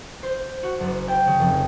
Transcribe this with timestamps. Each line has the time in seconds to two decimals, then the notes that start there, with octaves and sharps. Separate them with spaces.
0.23 C5
0.63 F#4
0.80 F#1
1.08 G5
1.27 C#3
1.40 F1